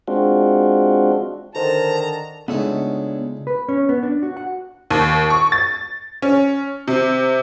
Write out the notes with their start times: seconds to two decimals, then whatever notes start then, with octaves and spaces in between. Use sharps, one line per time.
0.08 G#3 C4 D4 F4 F#4
1.56 D3 D#3 A4 C5 A5 A#5
2.48 C#2 A3 B3 D4 D#4 C#5
3.47 B4
3.68 C#4
3.89 B3
4.03 D4
4.23 F#4
4.37 F#5
4.91 D#2
5.30 C#6
5.52 A6
6.22 C#4
6.88 C3